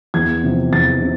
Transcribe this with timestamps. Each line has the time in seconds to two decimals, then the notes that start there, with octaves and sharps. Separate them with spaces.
0.14 E2 G#6
0.44 C3 F3
0.72 E2 A6
1.02 C3